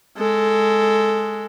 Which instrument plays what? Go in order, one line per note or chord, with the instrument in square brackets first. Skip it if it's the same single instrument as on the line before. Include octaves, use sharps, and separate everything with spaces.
[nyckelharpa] G#3 A4